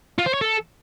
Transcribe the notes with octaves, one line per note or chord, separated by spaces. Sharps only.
F4
C5
C#5
A4